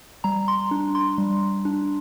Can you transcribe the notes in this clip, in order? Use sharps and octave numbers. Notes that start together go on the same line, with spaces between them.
G3 A#5
C6
D4
C6
G3
D4